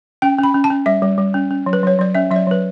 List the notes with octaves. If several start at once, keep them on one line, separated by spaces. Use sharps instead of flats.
C#4 G5
C#4
B5
C#4
A5
C#4
G3 E5
G3
G3
C#4
C#4
F#3
B4
F#3 C#5
F#3 D5
C#4 E5
F#3 E5
D5
F#3 B4